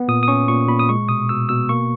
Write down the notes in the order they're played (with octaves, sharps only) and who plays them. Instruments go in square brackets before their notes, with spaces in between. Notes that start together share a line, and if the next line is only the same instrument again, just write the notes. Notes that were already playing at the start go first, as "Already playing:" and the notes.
Already playing: [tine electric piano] B3
A#2 D#6
D#6
C#4 C#6
A#2 C#6
A#2 B5
D#6
G#3 C#6
B2 D#6
B2 E6
B2 E6
A#3 C#6